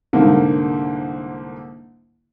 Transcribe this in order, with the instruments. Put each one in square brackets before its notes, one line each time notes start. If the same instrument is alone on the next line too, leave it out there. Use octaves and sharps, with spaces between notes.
[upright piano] C2 G#2 D3 A#3